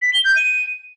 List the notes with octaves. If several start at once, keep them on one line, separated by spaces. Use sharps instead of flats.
B6
G7
G6
D#7